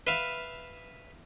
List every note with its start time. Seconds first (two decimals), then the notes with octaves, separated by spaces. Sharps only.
0.07 B4 E5 F5